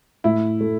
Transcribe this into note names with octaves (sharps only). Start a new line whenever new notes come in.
A2 E4
A3